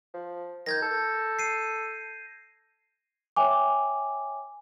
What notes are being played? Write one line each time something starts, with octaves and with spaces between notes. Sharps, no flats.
F3
D#3 G6 G#6 A#6
A4
C7 D#7
C#5 E5 G5 G#5 D6